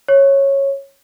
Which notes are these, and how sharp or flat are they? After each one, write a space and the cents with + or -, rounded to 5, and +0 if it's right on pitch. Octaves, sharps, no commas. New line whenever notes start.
C#5 -10